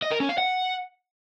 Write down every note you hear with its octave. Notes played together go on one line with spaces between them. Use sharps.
D#5
A#4
C#4
F5
F#5